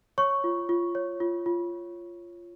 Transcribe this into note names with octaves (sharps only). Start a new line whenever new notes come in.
C#5 C#6
F4
F4
C#5
F4
F4